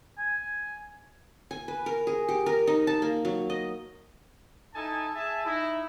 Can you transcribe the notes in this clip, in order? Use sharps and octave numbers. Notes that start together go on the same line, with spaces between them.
G#5
G#5
B4
A#4
G#4
G4
A#4
D#4
A5
A#3
F#3
D#5
D#4 E4 A4 G#5 A5
G#4 E5 G#5 A5
D#4 E4